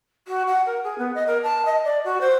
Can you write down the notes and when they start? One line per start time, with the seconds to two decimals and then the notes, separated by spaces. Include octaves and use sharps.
0.27 F#4
0.47 F#5
0.66 A#4
0.83 G#4
0.98 B3
1.14 D#5
1.27 A#4
1.43 A5
1.65 D#5
1.84 D5
2.04 F#4
2.21 C5